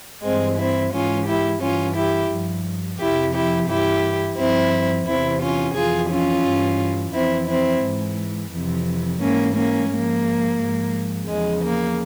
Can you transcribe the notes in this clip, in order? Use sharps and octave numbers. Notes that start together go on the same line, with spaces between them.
G2 E3 G#3 C4
C4 E4
G#2 E3 C#4 F4
E4 G4
G2 E3 C#4 F4
E4 G4
G2 F3
F2 C3 F3 E4 G4
E4 G4
G2 E3 E4 G4
G2 F3 C4 E4
E2 C3 E3 C4 E4
C#4 F4
F2 E3 F4 G#4
C#4 F4
G2 E3
F2 E3 C4 E4
C4 E4
G#2 E3
F2 C3 E3
G#2 E3 A#3 C#4
A#3 C#4
G#2 F3 A#3
G#2 F3
E2 C#3 F3 G#3
A#3